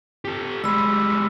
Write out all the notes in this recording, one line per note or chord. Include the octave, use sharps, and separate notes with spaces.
G4 A4
G3 G#3 B5 E6